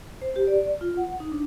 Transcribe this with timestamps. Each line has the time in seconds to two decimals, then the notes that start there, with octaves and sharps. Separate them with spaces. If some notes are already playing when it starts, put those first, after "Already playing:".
0.22 C5
0.36 G4
0.47 D5
0.81 F4
0.97 F#5
1.20 D#4
1.32 D4